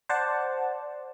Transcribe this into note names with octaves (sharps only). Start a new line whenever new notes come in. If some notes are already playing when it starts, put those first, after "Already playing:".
C5 D5 F#5 A5